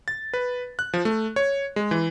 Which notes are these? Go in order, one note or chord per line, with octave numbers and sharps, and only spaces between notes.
A6
B4
F#6
F3
A3
C#5
G#3
E3